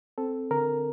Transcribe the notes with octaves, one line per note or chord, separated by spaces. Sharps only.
C4 A4
D3 A#4